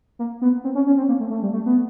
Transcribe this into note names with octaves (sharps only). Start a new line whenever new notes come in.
A#3
B3
C4
C#4
C#4
C4
A#3
A3
A3
G3
A3
B3